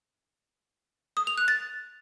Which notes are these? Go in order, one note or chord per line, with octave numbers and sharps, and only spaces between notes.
D#6
F7
F#6
A6